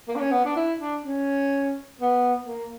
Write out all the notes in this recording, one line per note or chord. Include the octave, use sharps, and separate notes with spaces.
A#3
D4
C#4
B3
D4
E4
D4
C#4
B3
A#3